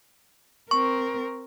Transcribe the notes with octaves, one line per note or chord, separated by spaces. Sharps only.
C4 A#4 C#6